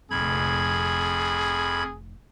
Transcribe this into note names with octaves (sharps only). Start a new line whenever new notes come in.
F1 A#1 F2 G#4 B5 G#6